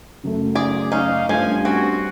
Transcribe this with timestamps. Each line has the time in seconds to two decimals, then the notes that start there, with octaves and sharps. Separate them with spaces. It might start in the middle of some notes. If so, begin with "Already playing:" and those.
0.24 F#2 C#3 A3
0.55 G#4 D5
0.92 C#4 D#4 F5
1.29 G2 F3 A3 C#4 G#5
1.65 C4 F#4